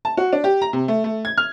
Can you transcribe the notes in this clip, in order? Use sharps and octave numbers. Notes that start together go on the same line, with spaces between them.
A5
F#4
D4
G4
A#5
C3
A3
A3
G#6
F6